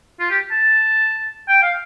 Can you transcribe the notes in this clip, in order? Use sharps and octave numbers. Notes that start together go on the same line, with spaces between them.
F4
G4
A5
G5
F5